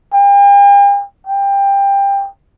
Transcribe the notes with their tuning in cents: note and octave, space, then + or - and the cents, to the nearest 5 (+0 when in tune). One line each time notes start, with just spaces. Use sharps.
G5 +45
G5 +20